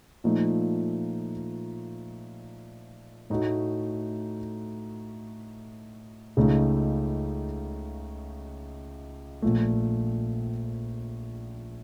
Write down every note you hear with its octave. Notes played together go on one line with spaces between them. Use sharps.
A#2 F3 A3 D#4
A2 A3 D#4 F#4
C#2 C#3 A3 D#4
A#1 A#2 A3